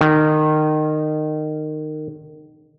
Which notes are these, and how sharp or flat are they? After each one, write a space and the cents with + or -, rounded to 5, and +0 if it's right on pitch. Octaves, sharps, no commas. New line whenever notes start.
D#3 -20